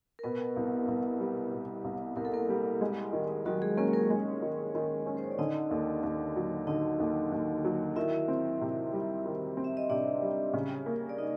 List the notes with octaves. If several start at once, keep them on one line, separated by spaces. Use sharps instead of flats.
A#4
B2 B3 B4
C2
C2
G3
B2
C2
C2 A#4
A4
A#3 A#4
G3
G#3
D#3
D#3 F#3 F#4
G#3 G#4
A#3 C#4 A#4
A#3 A#4
G#3
D#3
D#3
C#4
C5
C#5
D5
D3 D#4 D#5
D#2
D#2
F#3
D3 D#4 D#5
D#2
D#2
F#3
D#3 E4 E5
C4
C3
G3
D#3
C4
E5
D#5
C3 D4 D5
G3
C#3
A#3
D5
D#4 D#5